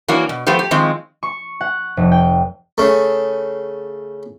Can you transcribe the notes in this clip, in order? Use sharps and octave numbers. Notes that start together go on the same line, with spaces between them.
E3 F#3 A#3 D4 F#4
B2
F3 A3 B3 G4 C5
G4
D#3 F3 G#3 C4
C#6
F#5
F1
G5
C#3 A3